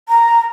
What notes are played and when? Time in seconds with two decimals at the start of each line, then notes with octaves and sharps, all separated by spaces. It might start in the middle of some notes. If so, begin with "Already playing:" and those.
0.09 A#5